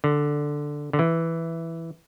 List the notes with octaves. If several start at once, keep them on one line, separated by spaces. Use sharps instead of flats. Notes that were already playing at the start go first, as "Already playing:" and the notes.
D3
D3
E3